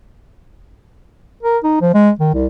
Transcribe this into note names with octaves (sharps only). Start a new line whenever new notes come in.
A#4
D#4
F3
G#3
D#3
C2